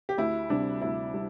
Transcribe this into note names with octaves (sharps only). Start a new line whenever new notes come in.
G4
D2 E4
C3 G3 D4
D2 E4
G3